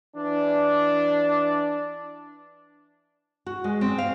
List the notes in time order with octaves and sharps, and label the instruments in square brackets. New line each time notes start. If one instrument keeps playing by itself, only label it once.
[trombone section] E3 D4
[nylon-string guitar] F#4
G#3
C4
F5